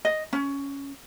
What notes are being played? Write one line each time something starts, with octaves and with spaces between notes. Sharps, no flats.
D#5
C#4